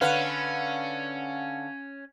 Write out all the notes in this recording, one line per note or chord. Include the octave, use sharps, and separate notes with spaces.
D3 C#4 B4 F5 F#5